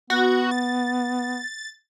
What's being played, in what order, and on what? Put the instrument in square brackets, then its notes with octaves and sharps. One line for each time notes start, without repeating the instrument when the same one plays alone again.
[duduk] B3 [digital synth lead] F#4
[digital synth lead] A6